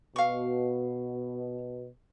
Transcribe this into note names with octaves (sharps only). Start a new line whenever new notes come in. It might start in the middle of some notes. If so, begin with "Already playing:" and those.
B2 F5 C#6